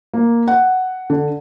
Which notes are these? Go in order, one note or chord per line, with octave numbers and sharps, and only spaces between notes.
A#3
F#5
D3